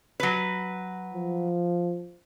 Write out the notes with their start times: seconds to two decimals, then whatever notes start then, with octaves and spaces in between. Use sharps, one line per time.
0.20 F#3 B4
1.14 F3